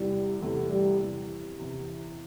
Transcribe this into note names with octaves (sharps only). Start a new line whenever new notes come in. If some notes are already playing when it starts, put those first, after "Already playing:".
Already playing: E2 C3 E3 G3
E2 C3 E3 A3
G3
E2 C3 E3
E2 C3 E3